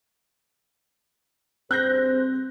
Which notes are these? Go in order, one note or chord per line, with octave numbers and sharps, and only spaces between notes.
G2 C4 G#4 C5 F#6 G6 A#6